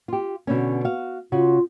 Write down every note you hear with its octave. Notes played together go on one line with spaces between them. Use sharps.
F4 G4
B2 D3 C#4
F#4 F5
C#3 F4 F#4